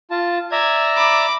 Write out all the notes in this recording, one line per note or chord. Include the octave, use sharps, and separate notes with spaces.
F4 A5
D5 E5 A#5 G#6
B5 D6